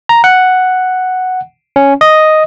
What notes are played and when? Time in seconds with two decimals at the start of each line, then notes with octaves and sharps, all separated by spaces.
0.09 A#5
0.24 F#5
1.76 C#4
2.01 D#5